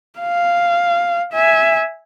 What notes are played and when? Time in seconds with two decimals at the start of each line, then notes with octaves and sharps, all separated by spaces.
0.20 F5
1.33 E5 G#5